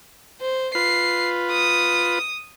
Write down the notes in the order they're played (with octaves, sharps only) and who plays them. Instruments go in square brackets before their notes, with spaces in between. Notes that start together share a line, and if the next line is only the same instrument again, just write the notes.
[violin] C5
[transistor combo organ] F4 B4 [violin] C7
[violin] D#6